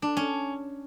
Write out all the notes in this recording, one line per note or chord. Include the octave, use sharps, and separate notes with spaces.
D4
C#4